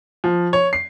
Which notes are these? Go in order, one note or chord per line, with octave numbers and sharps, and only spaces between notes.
F3
C#5
C7